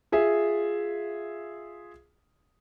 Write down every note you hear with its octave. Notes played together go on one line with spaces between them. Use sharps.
F4 G#4 E5